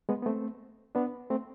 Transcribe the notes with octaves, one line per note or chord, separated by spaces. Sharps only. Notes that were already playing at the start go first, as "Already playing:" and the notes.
G#3 B3
B3
A3 C4
B3 D4
A3 C4